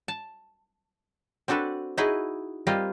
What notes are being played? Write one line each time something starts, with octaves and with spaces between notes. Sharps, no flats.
A5
C4 D4 F#4 A4 B4
D#4 E4 F#4 G#4 B4 D#5
G3 A#3 C4 F4 D#5